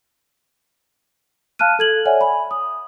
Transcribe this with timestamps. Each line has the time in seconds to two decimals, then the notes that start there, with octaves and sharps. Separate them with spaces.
1.59 F5 A5 F6 F#6 D#7
1.79 A4 G#6 F#7
2.05 C#5 D5 E5 F#5 G#5
2.21 G#5 B5
2.51 D#6